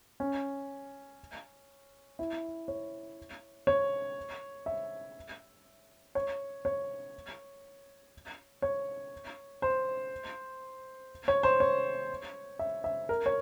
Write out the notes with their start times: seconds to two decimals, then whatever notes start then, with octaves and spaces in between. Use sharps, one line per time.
0.20 C#4
2.19 E4
2.68 C#5
3.67 C#5
4.66 E5
6.15 C#5
6.65 C#5
8.62 C#5
9.62 C5
11.28 C#5
11.43 C5
11.60 C#5
12.59 E5
12.84 E5
13.09 A#4
13.26 C#5